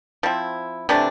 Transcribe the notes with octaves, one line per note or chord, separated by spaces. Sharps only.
F3 C4 E4
C3 E3 A3 D4